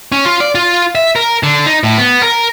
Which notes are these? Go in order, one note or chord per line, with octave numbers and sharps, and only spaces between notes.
C#4
F4
D5
F4
E5
A#4
D3
D#4
A2
B3
A#4